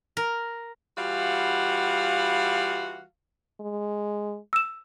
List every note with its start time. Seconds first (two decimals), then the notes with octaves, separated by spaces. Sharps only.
0.17 A#4
0.97 E3 G3 F4 F#4 F5 F#5
3.60 G#3
4.53 E6 E7